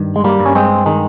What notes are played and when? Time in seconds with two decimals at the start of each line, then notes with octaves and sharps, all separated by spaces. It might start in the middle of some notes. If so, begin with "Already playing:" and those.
Already playing: G2 D#3
0.16 G#3
0.24 G3 A#3
0.39 G2
0.46 C#4
0.55 G#3 C4
0.86 D#3 G#3